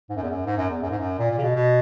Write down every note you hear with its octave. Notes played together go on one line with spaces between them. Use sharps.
G#2
F#2
E2
F#2
G#2
F#2
E2
F#2
G#2
F#2
A#2
A#2
C#3
B2
B2